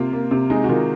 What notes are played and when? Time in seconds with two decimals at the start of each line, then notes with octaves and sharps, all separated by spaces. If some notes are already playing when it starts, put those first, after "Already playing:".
Already playing: C3 A#3 F4
0.13 A#3
0.31 C3
0.50 G#3 D#4
0.64 F#4
0.69 D#3 F4